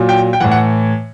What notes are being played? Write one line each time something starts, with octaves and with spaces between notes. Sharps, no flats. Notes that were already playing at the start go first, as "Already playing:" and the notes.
Already playing: A#2 F#3
G5
G5
A2 E3 F#5
F#5